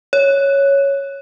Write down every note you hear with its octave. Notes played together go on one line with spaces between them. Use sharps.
C#5